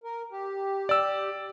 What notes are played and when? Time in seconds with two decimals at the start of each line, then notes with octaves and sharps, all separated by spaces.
0.04 A#4
0.31 G4
0.89 D5 E6